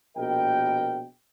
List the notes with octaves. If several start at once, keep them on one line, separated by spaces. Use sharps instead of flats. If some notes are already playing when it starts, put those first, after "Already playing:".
A#1 B2 A#4 D#5 G5